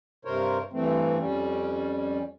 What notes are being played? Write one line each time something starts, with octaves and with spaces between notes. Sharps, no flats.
G2 C3 A#4 C5 C#5
G2 E3 A3 C4
F2 G3 C#4